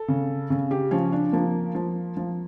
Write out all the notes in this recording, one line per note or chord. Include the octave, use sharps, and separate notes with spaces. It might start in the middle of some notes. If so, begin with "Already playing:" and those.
Already playing: A4
C#3
C#3
G4
F3 C#4
D4
F3 A#3
F3
F3